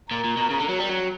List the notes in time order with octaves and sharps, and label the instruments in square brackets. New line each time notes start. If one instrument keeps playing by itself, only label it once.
[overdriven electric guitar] A#2 [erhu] A#4
[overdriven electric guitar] A#2
B2
C#3
D3
F#3
G3
F#3